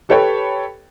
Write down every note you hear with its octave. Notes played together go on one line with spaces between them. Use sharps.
G4 A4 B4 C#5 G5 B5